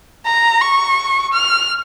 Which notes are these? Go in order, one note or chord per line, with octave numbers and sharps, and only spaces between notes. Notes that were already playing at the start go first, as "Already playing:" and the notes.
A#5
C#6
F6